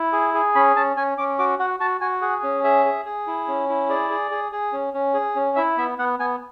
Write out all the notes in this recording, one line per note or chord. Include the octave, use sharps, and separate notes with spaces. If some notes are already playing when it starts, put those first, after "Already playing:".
Already playing: E4
G#4
G#4
C#4 B5
C#4 A5
C#4 G#5
C#4 D6
F#4 D6
F#4 F#5
F#4 A5
F#4 G#5
G#4 F#5
C#4
G#4 E5
G#4
G#4
E4
C#4
E4
G#4 D5
G#4
G#4
G#4
C#4
C#4
G#4
C#4
E4 E5
B3 E5
B3 F#5
B3 G#5